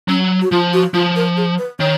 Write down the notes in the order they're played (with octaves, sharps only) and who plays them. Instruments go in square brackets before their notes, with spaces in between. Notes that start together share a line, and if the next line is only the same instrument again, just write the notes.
[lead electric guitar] F#3 [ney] C#4
[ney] F#4
[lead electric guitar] F3 [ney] F4
[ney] F#4
[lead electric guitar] F3 [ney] F4
[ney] A#4
G#4
B4
[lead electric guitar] D#3 [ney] C#5